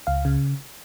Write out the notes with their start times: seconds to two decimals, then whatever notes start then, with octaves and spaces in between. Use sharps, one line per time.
0.07 C#2 F5
0.25 C#3